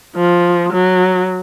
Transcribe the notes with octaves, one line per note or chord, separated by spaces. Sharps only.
F3
F#3